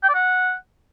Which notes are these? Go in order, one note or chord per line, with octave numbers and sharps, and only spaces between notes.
G5
D5
F#5